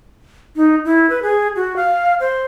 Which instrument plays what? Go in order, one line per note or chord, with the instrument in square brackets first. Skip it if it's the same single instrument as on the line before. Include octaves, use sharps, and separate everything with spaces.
[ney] D#4
E4
B4
G#4
F#4
F5
C5